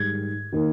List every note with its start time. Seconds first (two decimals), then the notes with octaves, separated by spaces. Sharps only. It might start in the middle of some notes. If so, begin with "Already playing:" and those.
Already playing: G#2 D#3 G3 G#6
0.52 D#3 A#3